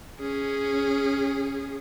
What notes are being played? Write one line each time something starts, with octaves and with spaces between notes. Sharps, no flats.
C#4 G#4